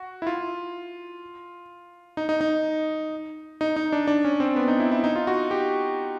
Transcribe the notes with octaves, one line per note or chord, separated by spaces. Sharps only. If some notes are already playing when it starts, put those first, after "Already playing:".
Already playing: F#4
E4
F4
D#4
D#4
D#4
D#4
D#4
D4
D4
C#4
C4
B3
D#4
E4
E4
D#4
F4
F#4
G4